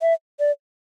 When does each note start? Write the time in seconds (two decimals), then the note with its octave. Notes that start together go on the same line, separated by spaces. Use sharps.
0.02 E5
0.40 D5